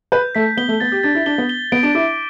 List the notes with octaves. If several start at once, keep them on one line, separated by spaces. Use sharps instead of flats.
B4 G6
A3 B6
B3 G7
A3
B3 A6
G4
D4 A6
E4
D4 G7
B3
G7
B3 D7
D4
E4 D6